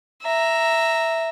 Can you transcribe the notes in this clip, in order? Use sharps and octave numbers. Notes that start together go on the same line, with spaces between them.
E5 A#5